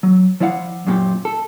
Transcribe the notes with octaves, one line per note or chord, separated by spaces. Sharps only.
F#3
F3 E4 D5 F5 F#5
F#2 A#2 G4
A4